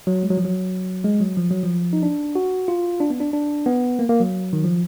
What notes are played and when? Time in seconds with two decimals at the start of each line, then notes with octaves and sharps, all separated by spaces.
0.07 F#3
0.23 G#3
0.30 F#3
0.37 F3
0.45 F#3
1.04 G#3
1.21 F#3
1.37 F3
1.51 F#3
1.63 F3
1.93 D#4
2.03 D4
2.35 F#4
2.68 F4
3.00 D4
3.10 B3
3.20 D4
3.33 D4
3.66 B3
3.99 A#3
4.09 A#3
4.20 F#3
4.53 D#3
4.64 F3